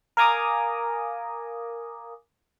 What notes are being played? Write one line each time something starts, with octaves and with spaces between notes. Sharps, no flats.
A#4 F5 G#5 A#5 D6 D#6